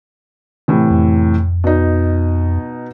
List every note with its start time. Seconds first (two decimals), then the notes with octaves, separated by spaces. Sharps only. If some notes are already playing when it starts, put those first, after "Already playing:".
0.68 A2 C3 E3
0.91 F2
1.64 B2 D#4